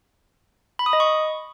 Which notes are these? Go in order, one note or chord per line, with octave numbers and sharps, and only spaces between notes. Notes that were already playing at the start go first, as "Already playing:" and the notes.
B5
D#6
D#5
C#6